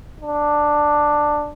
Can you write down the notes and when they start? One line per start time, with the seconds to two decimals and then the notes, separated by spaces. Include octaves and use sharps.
0.21 D4